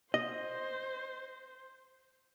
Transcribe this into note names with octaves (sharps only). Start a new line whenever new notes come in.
C5 D#5